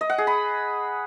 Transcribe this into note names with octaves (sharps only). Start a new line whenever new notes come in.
D#5
F#5
G#4
B5